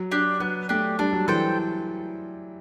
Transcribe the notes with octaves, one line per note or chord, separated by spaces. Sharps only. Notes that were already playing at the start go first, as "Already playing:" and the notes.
Already playing: F#3
D4 G4
F#3 B3
A3 D4 G4
G3 D4
F#3
E3 A4 C5 G5